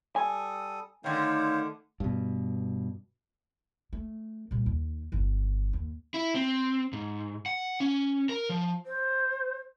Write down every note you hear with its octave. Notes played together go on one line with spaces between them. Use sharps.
G3 A4 G#5 D#6
D3 D#3 A3 D#4 C5 C#5 F5
G2 B2
A3
A#2 G3
D#2
G1 E3
D#2
E4
C4
G#2
F#5
C#4
A#4
F3
C5